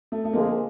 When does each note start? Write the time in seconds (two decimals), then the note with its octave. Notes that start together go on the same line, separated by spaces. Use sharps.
0.12 A3
0.25 A3
0.33 G1 F2 D3 F3 G#3 A#3